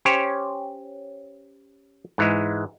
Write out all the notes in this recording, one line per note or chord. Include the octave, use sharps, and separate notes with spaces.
C#4 G4 C5 C#5
G#2 E3 G#3